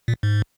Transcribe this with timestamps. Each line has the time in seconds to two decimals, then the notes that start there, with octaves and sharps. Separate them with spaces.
0.08 A#2
0.23 G#2